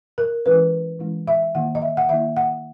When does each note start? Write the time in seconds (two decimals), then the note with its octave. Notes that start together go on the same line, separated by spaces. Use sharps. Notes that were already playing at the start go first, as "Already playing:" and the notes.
0.18 A#4
0.46 E3 G#3 C#4 E4 B4
0.99 E3 G#3 C#4 E4
1.27 E5
1.55 D#3 A#3 E4 F#5
1.75 D#5
1.82 E5
1.97 F#5
2.09 D#3 A#3 E4 E5
2.37 F#5